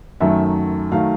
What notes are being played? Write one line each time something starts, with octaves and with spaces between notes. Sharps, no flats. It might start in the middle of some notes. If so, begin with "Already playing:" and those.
F#2 D#3 F#3 A3 E5
D#3 F#3 A3 F5